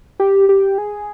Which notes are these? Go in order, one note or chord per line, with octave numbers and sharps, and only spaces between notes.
G4
G4
G#4